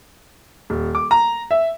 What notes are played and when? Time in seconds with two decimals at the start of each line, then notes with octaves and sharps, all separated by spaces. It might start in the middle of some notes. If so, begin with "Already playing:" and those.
0.70 D#1
0.95 D6
1.11 A#5
1.51 E5